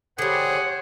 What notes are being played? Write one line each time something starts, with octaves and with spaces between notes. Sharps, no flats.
D3 G3 G#4 C5 C#5 F#5